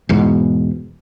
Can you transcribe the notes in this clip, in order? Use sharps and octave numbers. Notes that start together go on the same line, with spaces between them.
E2 G#2 B2